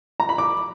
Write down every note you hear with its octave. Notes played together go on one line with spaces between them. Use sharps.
A#5
B5
D6